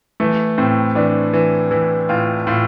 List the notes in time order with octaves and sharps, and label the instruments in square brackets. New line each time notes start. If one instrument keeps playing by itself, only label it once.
[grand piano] E3 A3
A2 C4
E3 D4
E3
E3 E4
A2 F4
A2 F4